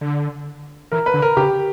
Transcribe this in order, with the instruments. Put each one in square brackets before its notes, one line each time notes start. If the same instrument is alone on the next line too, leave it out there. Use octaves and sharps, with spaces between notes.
[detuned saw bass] D3
[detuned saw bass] E3 [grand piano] A#4
[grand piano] B4
[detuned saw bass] D3
[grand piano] A#4
[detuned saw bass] C#3 [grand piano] G4